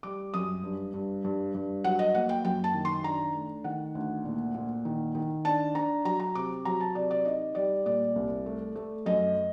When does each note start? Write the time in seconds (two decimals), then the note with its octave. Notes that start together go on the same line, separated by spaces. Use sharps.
0.03 G3 D6
0.34 F#2 D#6
0.63 G2
0.93 G2
1.24 G2
1.54 G2
1.84 F#3 F#5
1.99 D#5
2.14 A#3 F#5
2.29 G5
2.45 F#2 G5
2.64 A5
2.74 D#3
2.85 C6
3.04 D4 A#5
3.34 A3
3.64 D#3 F#5
3.95 D2
4.25 A#2
4.54 A#2
4.85 D#3
5.15 D#3
5.45 D4 A5
5.75 D4 A#5
6.05 F#3 A#5
6.20 A#5
6.35 C3 D6
6.65 F#3 A#5
6.81 A5
6.95 C3 D5
7.11 D5
7.25 D#4 D#5
7.55 G3 D5
7.86 A#2 D5
8.16 C2
8.46 A3
8.75 A3
9.06 F#2 D#5